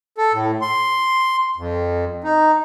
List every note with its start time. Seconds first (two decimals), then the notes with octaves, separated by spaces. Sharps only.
0.18 A4
0.33 A2
0.61 C6
1.57 F2
2.24 D#4